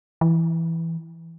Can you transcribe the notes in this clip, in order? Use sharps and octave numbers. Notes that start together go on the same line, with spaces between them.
E3